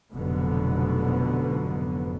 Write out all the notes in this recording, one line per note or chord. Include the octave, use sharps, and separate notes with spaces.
F1 G#2 B2 D3 F#3 B3